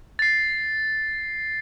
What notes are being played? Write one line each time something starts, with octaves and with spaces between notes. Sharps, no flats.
A6 C7